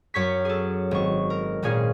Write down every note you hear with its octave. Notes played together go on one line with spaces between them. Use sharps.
F#2 C#5 C#6 B6
G#4 A4
G#1 C#6
A#4
G#1 A#2 C#4 G#4